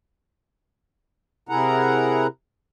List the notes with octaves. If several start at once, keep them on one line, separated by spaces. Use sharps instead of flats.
C3 E4 G#4 A#4 F#5 A#5